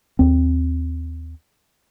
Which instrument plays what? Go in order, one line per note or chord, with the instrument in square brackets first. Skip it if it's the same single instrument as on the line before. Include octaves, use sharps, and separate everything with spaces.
[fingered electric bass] D#2 C4